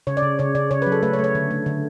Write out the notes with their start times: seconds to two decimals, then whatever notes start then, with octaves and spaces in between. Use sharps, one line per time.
0.07 C#3 C#5
0.17 D5
0.22 C#3
0.39 C#3 C#5
0.55 C#3 D5
0.71 C#3 C#5
0.82 B4
0.86 F#3
0.92 A4
1.03 A3 B4
1.13 C#5
1.19 A3
1.24 C#5
1.35 D3
1.51 A3
1.66 D3